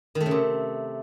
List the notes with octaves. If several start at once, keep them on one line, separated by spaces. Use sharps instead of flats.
D#3
A3
C#3
C3